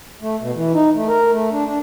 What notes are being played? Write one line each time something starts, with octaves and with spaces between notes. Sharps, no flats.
A3
B2
E3
D#4
A3
A#4
A3
D4
D4